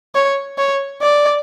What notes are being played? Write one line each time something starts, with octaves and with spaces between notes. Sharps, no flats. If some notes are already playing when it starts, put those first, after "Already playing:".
C#5
C#5
D5